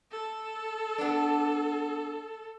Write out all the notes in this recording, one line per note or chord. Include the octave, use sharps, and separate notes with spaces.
A4
B3 D4